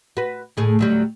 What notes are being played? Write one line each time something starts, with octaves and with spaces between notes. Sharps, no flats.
F#4 B4
D2 A2 G#4
D2 F#3 G3